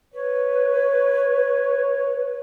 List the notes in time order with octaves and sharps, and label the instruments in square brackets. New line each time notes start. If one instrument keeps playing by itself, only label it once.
[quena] B4 [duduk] C#5